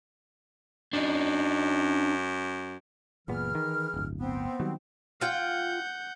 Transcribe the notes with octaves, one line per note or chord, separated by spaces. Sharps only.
F#2 D4 D#4
F#1 A#2 E3 B3 G#4 F6
D#3
D1 G1
B3 C4
D#3 F#3 G3
F4 F#5 G5 G6